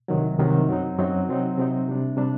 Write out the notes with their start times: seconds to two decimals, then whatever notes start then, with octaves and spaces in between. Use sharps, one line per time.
0.08 C2 C3 D#3 F#3
0.38 C2 C3 D#3 F#3
0.68 F#2 F#3 C4 D#4
0.98 F#2 F#3 C4 D#4
1.28 C3 F#3 C4 D#4
1.58 C3 F#3 C4 D#4
1.88 C3 G3 D4
2.17 C3 G3 D4